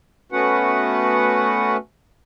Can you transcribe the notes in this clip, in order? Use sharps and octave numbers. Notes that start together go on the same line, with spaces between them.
A3 B3 C#4 F#4 B4 F#5